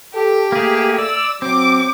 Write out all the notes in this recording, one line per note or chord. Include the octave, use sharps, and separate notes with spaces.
G4 A4
A3 A#3 G#4
D5 E6
F#3 C4 D6